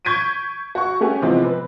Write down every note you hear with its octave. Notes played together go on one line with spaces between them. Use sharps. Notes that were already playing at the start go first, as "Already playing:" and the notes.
C#6 G6 G#6 B6 D7 D#7
F#4 C#6
A3 C#4 G4 F#5 G#5
C3 E3 F3 G#3 B3 C4
B4